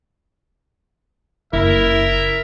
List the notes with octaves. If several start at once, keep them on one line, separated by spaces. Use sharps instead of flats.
F#1 E4 A#4 E5